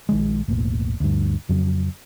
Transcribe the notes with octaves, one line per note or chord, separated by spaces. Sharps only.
A#1 D#3 G#3
E1 B1 A2 A#3
D2 G2
F2 C#3 F#3